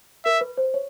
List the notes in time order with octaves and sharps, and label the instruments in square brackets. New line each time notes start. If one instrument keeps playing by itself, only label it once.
[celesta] A#4 [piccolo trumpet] E5
[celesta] B4
C5
C#5